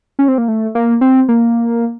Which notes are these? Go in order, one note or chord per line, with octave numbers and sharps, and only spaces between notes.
C#4
C4
A#3
A3
A#3
C4
A#3